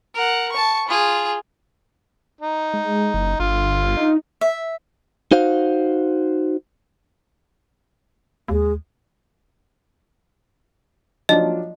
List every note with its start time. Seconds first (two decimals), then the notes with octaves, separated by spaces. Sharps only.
0.15 A#4 F#5
0.52 A5 C#6
0.88 F4 G#4
2.40 D#4
2.73 G#3
3.14 F#1
3.40 G1 D3 F4
3.97 D#4
4.41 E5
5.32 D#4 F#4 C5 F5
8.48 D#2 G#3
11.29 F3 F#3 D4 D#5